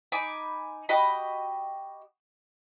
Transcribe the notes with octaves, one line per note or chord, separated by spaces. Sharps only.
D#4 G#5 B5 D6
F#4 G4 D#5 B5